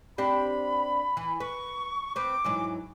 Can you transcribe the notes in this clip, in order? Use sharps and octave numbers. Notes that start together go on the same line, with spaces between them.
C4 D4 G4 B5
E3
B4 C#6
C4 B4 D6
G#2 E3 F#3